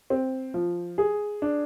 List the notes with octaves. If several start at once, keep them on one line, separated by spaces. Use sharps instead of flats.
C4
F3
G#4
D4